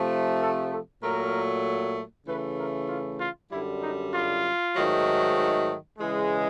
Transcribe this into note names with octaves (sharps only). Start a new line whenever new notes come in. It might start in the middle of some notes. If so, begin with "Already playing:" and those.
Already playing: C3 F3 A3
A4
A4
A#2 F#3 A3 A#4
C#3 E3 A3 B4
A#4
F4
F4
F#2 D3 G3 E4
D#4
F4
G#2 D#3 F#3 A3
C#3 E3 G#3